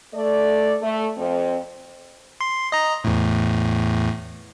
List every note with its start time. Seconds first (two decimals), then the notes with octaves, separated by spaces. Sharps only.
0.14 A3 D5
0.81 A3
1.17 F2 C4
2.41 C6
2.72 D#5 A#5
3.04 E2 A2